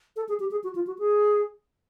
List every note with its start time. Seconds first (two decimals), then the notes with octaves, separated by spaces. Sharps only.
0.16 A4
0.29 G#4
0.40 G4
0.51 G#4
0.64 F#4
0.75 F4
0.87 F#4
0.99 G#4